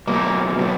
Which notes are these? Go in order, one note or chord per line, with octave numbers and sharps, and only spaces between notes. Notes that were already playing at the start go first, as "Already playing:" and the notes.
B2 F#3 A3 A#3
B2 F#3 A3